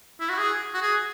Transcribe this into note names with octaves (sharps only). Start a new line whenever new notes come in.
E4
F#4
G#4
F#4
G#4